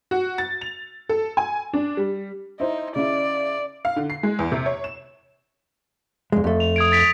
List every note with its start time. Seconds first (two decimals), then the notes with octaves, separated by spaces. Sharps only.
0.11 F#4
0.38 A6
0.61 F7
1.09 A4
1.37 G#5
1.73 D4
1.97 G3
2.60 D#4 E4 C5
2.96 C#3 E4 D5
3.85 F5
3.96 D3
4.10 C7
4.23 G#3
4.39 E2
4.52 C3
4.66 C#5
4.84 E7
6.32 F2 G#3
6.44 F2 A3
6.60 F7
6.76 D#6 G#6 D7
6.92 A6 B6 D7